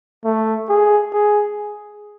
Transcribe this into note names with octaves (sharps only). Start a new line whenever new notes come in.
A3
G#4
G#4